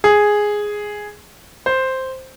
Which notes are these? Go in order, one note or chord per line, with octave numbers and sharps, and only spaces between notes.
G#4
C5